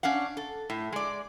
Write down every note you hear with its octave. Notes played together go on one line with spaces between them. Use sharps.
C#4 D4 F5 F#5
A4
A2
G#3 D5